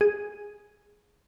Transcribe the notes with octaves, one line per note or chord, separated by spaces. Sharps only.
G#4